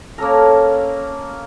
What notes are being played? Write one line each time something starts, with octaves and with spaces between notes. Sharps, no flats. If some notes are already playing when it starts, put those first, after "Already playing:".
A#3 C#4 A4 A#4